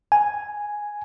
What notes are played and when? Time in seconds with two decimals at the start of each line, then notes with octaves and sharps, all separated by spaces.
0.12 G#5